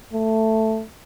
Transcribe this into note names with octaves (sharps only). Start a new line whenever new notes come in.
A3